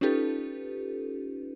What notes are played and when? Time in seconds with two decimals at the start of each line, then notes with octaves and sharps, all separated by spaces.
0.01 C#4 D#4 F4 G4 A4 B4